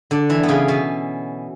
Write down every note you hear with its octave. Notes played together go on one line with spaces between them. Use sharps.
D3 D4
E3 E4
B3
C#3 C#4
B2 B3